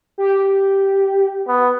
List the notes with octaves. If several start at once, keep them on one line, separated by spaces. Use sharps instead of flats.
G4
B3